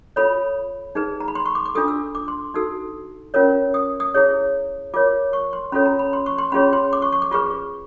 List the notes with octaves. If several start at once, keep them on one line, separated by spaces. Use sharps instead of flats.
F4 A4 C#5 B5
D#4 G#4 B4
A#5
B5
C6
C#6
D6
D6
D4 F4 A4 D#6
E6
D6
C6
D#4 F#4 A4 E6
C#4 F4 A#4 C#5
D#6
D#6
E4 G#4 C#5
F4 A#4 C#5 D6
C#6
C6
C#4 F4 A4 C#5 B5
A#5
B5
C6
C#6
C6
C#4 F4 G#4 C#5 B5
C6
D6
C#6
C#6
D6
F4 G#4 B4 C#6